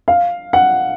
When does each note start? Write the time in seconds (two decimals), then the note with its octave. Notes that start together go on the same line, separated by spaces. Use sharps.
0.08 F5
0.53 F#5